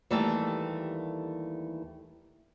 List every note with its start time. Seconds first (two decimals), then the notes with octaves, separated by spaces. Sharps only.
0.11 D#2 E3 G3 A3 A4